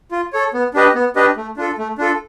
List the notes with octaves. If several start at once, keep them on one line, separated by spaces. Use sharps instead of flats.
F4
A4 C#5
B3
D4 G4 B4 D#5
B3
D4 G4 B4 D#5
A3
D4 F4 A4
A3
D4 F4 A4